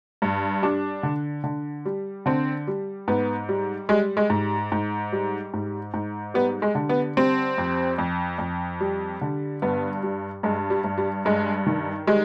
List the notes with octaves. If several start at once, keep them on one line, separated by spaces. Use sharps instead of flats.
G2
G3 D4
D3
D3
G3
D3 C4
G3
G#2 B3
G3
G3 G#3
G#3
G#2
G#2
G3
G#2
G#2
G3 B3
G#3
D3
B3
G3 C4
F2
F2
F2
G3
D3
G2 B3
G3
G2 G#3
G3
G2
G3
G2 G#3
D#3
G3 G#3